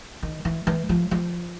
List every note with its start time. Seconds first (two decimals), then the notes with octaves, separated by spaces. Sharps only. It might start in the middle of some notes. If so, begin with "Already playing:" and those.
0.23 D#3
0.45 E3
0.67 E3
0.89 F3
1.11 F3